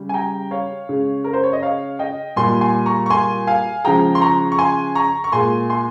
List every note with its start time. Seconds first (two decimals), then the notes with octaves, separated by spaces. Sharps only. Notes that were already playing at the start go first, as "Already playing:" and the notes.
Already playing: C#3 G3
0.09 G#5
0.14 G5 A#5
0.51 C#5 F5
0.89 C#3 G#3
1.24 A#4
1.33 C5
1.43 C#5
1.53 D#5
1.62 C#5 F5
1.99 D#5 G5
2.36 A#2 G3 G#5 C6
2.61 G#5 C6
2.86 A#5 C#6
3.06 C#6
3.10 G#5 C6
3.47 F5 G#5
3.84 C#3 F3 G#3 G5 A#5
4.15 C6
4.21 A#5 C#6
4.52 C#6
4.58 G#5 C6
4.95 A#5 C#6
5.24 C#6
5.32 A#2 G#3 G#5 C6
5.70 G#5 C6